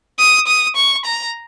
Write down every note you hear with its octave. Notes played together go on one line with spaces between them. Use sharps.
D#6
D#6
C#6
A#5